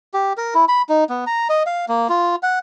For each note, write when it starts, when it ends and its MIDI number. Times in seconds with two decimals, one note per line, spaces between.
0.14 0.33 67
0.37 0.54 70
0.54 0.65 64
0.68 0.82 83
0.89 1.04 63
1.09 1.24 59
1.27 1.48 82
1.49 1.63 75
1.66 1.85 77
1.89 2.08 58
2.09 2.36 65
2.43 2.59 78